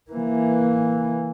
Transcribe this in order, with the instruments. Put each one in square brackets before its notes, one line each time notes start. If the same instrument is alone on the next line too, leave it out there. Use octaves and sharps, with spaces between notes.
[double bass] E3 A#3